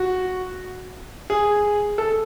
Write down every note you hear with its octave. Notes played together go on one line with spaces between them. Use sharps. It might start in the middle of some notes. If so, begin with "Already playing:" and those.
Already playing: F#4
G#4
A4